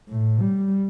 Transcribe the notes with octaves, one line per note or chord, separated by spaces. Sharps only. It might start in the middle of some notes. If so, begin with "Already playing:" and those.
A2
G3